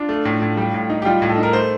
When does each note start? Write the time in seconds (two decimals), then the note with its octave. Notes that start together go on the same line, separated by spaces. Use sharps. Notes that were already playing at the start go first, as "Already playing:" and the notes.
Already playing: D4 F4
0.09 A3
0.25 A2
0.42 A2
0.57 G3
0.74 A2
0.90 D#4
1.02 G4
1.05 G3 F4
1.22 A2
1.29 A4
1.38 D#4
1.43 A#4
1.53 A3 C5